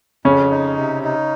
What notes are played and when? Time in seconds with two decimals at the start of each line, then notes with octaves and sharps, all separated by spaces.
0.25 F2 C#3 C#4
0.51 D#4
0.77 C3
1.03 D#4